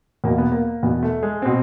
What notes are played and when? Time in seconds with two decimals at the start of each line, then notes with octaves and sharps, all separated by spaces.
0.24 E2 B2 A#3
0.38 B3
0.52 A#3
0.83 E2 B2 B3
1.03 A3
1.23 G#3
1.42 B2 C4